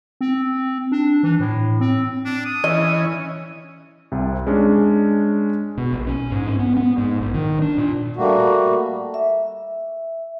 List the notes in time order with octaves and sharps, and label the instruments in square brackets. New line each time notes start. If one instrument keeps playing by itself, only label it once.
[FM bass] C4
D4
E3
A2
C4
[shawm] D4
D#6
[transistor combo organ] E3 C#4 [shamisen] D#5
[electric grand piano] C2 C3
G#3 C#4 D4
[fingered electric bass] B2
A#1
C#4
G#2
C#4
B3
B3
G#2
A#1
D#3
D4
A#2
[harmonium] G3 A3 A#3 F#4
[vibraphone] E5